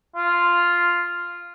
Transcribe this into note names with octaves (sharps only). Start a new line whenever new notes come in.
F4